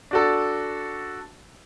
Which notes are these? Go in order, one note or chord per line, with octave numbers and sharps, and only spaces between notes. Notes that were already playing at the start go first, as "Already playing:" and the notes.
D4 F#4 A4